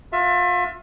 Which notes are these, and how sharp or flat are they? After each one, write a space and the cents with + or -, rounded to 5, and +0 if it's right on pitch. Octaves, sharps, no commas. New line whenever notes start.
F4 +35 E5 +25